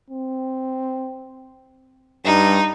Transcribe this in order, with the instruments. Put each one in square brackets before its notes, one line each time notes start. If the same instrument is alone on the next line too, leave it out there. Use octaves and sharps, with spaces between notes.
[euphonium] C4
[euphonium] G2 [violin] D#4